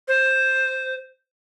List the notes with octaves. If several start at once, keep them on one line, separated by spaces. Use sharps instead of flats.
C5